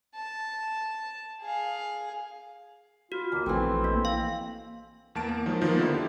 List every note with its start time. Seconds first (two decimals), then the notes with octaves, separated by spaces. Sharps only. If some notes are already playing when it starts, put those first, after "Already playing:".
0.15 A5
1.41 G#4 F5
3.12 F4 F#4
3.32 D#2 A#3
3.46 A#1 E3 A3 C4
3.84 A#3
4.05 F5
5.15 E2 A#3 A5 D7
5.29 A#3
5.46 D#3 F3 F#3 G#3
5.61 D#3 F3 A#3 B3 F4
5.79 D3 A#3 E4
5.94 G4